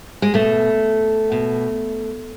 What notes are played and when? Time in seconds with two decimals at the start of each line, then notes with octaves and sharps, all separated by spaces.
0.22 G#3
0.34 B2 A3
1.32 B2